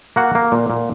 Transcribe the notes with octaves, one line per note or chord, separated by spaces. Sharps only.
A#3 F#4 F#5
A#3
A#2
A#2